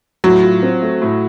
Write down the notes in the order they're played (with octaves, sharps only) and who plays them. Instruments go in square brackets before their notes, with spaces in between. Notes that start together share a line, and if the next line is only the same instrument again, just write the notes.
[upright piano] A2 [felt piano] F#3
[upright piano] F4
C4
A3
A2